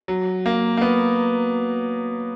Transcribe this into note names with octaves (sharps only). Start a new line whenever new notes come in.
F#3
A#3
A#3
B3